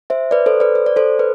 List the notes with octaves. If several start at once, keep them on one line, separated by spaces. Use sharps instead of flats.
C5 E5
B4 D5
A4 C5
B4 D5
C5
D5
A4 C5
B4